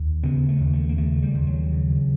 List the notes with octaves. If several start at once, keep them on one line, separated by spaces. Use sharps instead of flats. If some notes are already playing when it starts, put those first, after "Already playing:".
Already playing: D#2
C#3 B3
A3
D#2
A3
A#3
C#3 A3
G3
D#2
F#3
C#3